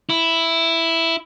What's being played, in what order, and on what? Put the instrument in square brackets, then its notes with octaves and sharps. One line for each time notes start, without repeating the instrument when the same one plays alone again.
[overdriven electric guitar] E4